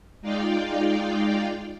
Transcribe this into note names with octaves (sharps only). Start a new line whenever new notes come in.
G#3 D#4 F4 D5 F5 G5